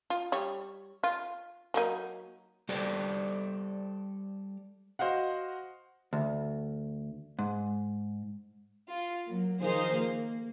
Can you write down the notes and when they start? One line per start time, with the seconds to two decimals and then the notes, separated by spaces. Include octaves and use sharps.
0.10 F4
0.32 G3 C#5
1.04 F4
1.74 F#3 A#3 D#4
2.69 G3 G4 A4 C5 D5
4.99 F#4 C5 D#5 F5 F#5
6.13 D2
7.39 G#2
8.89 F4
9.27 F#3 A#3
9.60 D#3 F3 D#4 G#4 C5 F5
9.95 A#3